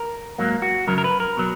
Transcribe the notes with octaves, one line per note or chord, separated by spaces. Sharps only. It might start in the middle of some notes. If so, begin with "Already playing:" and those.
Already playing: A#4
G#2 F#3 A#3
F#4
F#2 C#3 F#3 A#4
A#4
B4
A#4
B2 F#3